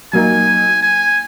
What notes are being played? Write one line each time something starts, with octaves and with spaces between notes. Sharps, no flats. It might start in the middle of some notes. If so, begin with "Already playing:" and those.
F#3 A#3 D#4 G#5
G#5